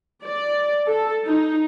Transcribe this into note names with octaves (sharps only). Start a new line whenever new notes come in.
D5
A4
D#4